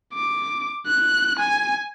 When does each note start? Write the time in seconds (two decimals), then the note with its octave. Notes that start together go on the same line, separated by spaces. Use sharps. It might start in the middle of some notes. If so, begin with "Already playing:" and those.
0.14 D6
0.87 F#6
1.39 G#5